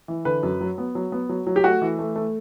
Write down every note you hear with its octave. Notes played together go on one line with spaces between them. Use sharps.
E3
D3 B4
F#2
F#3
B3
F#3
B3
F#3
F#3
G4
A3 F#4
E3
A3
A3